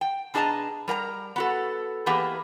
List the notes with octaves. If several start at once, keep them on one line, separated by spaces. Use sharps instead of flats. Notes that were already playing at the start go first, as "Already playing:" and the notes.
G5
B2 D4 G#4 D#5 A5 A#5
G3 A#4 F#5 A#5
B3 F#4 A4
E3 A#3 B3 G4 G#4 B4